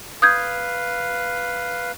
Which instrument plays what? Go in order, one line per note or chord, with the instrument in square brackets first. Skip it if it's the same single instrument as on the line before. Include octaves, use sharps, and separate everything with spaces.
[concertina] B4 F5 [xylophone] D#6 G6 G#6